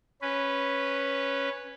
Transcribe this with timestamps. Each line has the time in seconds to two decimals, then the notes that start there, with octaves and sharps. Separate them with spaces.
0.21 C#4 B4